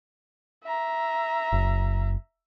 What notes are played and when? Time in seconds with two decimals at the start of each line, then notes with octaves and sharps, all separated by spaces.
0.64 E5 A#5
1.52 F#1